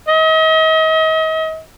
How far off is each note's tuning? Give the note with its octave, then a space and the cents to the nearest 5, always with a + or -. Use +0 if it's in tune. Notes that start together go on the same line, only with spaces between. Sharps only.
D#5 +40